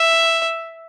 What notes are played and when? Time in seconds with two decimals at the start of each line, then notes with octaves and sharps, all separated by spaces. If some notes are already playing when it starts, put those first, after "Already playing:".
Already playing: E5